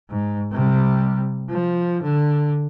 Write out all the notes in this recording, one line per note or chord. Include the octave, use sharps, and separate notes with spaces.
G#2
C3 G3
F3
D3